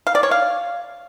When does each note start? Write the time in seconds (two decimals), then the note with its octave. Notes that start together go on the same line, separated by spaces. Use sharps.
0.07 F5
0.15 D5
0.23 C#5
0.31 F5